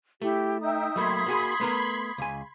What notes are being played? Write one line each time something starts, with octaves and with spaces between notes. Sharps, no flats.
A3 E4 G4
D#4 E5 G5 D#6
F#3 A3 A#3 B5 C6 G#6
A#3 F#4 G#4
A3 B3 A#4
C#2 G#5